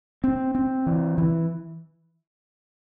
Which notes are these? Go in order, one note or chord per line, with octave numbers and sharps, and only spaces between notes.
C4
C4
E3
E3